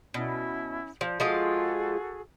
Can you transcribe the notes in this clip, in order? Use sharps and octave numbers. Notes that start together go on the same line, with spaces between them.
B2 C#4 E4
F3
F3 G#3 F4 F#4 G#4 A4